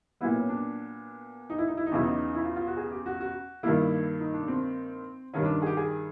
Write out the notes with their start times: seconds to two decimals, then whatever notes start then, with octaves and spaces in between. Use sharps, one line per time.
0.21 A#2 F#3 B3 E4
0.35 C#4
0.49 D4
1.50 D#4
1.58 E4
1.68 D#4
1.77 E4
1.86 D#4
1.91 E2 C#3 F#3 E4
2.05 D#4
2.35 E4
2.45 F4
2.56 F4
2.67 F#4
2.77 G#4
2.91 G4
3.06 F#4
3.21 F#4
3.63 G2 D#3 G3 A#3 E4
4.20 D#4
4.34 D4
4.48 C4
5.34 G2 D#3 G3 C#4
5.45 D4
5.62 G#4
5.66 G4
5.77 G#4